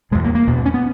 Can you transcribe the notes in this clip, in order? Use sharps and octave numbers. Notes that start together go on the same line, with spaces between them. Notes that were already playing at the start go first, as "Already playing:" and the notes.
E2 B2 G#3
A#3
A#3
E2 B2
B3
C#4
B3